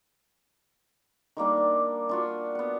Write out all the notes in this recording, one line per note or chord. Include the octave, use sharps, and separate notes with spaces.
D#3 G3 A#3 D4
D5
D4 F4 F#4
B3 F#5